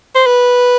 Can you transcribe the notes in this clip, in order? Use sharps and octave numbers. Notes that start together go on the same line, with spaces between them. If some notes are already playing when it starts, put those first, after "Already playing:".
C5
B4